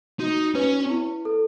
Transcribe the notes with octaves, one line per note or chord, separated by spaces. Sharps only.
D#4 F#4
C#4 B4
E4
A4